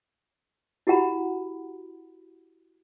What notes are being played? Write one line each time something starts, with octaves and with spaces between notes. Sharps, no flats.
E4 F#4 G4 F#5 A#5 B5